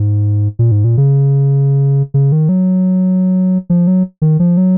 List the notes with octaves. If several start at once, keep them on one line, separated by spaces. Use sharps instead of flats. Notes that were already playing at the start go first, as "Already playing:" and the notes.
Already playing: G#2
A#2
G#2
A#2
C#3
C#3
D#3
F#3
F3
F#3
D#3
F3
F#3